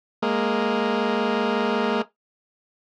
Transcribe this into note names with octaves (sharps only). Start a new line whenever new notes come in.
G#3 A#3